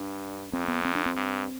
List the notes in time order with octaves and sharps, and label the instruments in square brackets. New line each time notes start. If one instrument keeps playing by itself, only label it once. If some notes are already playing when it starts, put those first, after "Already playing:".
Already playing: [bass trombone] G2 [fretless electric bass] D4
[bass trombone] F2 [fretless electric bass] C4
[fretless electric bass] B3
C4
D4
C4
[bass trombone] G2